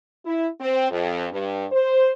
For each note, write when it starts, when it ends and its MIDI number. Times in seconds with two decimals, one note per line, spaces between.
0.25 0.47 64
0.60 0.87 60
0.90 1.25 41
1.30 1.65 43
1.72 2.11 72